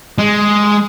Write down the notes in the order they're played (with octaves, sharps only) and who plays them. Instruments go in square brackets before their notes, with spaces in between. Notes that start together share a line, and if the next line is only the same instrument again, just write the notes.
[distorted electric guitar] G#3